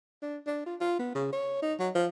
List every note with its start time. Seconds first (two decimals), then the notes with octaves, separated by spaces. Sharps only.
0.22 D4
0.46 D4
0.66 F4
0.80 F4
0.99 B3
1.15 C#3
1.32 C#5
1.62 D#4
1.79 F#3
1.95 F3